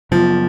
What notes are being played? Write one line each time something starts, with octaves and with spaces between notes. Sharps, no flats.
F#2 C#3 F3 F#3 B3